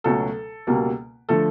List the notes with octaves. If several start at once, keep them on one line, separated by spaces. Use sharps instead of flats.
C#2 B2 F#3 A3 A4
C#2 B2 G3 A#3
D3 F3 A3 A4